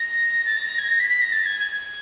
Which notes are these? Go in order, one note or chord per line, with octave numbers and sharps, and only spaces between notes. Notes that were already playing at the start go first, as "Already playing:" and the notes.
Already playing: A#6
A6
A#6
A#6
G#6
A#6
B6
B6
A#6
A6
G#6
G#6